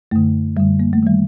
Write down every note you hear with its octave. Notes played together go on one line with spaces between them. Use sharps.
F#2 D3 A3
F#2 D3 G3
A#3
A3
D#3 G3